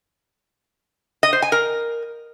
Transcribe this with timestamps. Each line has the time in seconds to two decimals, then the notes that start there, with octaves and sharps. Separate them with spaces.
1.23 D#5
1.33 C5
1.42 G#5
1.52 A#4